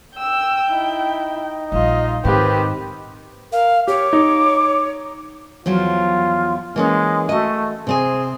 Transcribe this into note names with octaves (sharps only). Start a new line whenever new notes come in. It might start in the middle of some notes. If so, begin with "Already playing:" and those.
G5 E6
D#4 E4
A#1 G3 F4 D#5
G#2 D#3 C4 G4 B4
A#4 F5
G4 C#5 D6
D#4
E2 F3 F#3 F4
E3 G#3 A#3 C#4
A3 F#4 D#5
C3 C4 G#4 G#5